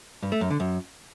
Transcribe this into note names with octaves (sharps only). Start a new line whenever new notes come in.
G2
A3
F#2
D3
F#2